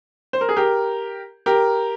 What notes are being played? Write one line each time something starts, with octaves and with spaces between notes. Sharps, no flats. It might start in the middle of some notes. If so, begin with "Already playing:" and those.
C5
A#4
G#4
G4 A#4
G4 A#4